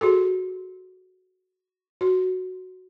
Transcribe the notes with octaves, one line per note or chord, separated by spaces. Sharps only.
F#4 G#4 A4
F#4